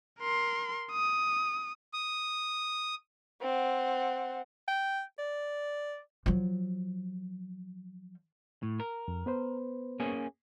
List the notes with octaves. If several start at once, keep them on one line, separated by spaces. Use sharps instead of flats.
A#4 C6
D#6
D#6
C4 F#5
G5
D5
F3 F#3
A2
A#4
F2
B3 B4 C5
A#3 C#4 G#4